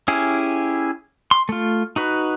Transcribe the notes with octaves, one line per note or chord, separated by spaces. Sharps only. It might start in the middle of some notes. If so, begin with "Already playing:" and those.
C#4 E4 G4 G#4
C6
A3 F4
D#4 F#4 B4